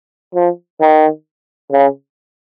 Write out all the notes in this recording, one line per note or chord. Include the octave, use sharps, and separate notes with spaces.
F3
D#3
C#3